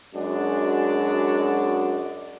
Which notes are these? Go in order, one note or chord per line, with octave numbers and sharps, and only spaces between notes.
F#2 G#3 D4 F#4